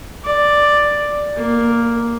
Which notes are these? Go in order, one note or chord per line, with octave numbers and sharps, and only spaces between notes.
D5
A#3